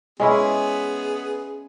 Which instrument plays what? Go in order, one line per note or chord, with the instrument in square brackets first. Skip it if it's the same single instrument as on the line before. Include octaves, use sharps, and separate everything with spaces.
[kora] G#3 C#4 E4 [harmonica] B3 G#4